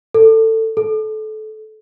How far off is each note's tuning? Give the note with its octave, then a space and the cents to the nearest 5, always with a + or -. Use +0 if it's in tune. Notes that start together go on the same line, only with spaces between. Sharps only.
A4 +20
A4 -25